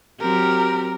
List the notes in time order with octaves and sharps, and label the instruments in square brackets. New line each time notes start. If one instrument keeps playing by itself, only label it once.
[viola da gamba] F#3 C4 G4 [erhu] A#4